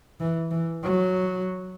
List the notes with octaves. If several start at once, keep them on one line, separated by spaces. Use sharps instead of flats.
E3
E3
F#3